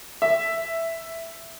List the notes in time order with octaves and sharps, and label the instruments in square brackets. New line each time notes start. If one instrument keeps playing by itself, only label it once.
[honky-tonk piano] E5